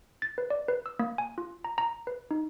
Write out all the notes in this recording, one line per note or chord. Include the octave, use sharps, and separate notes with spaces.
A6
B4
D5
B4
E6
A#3
G#5
F4
A#5
A#5
B4
D#4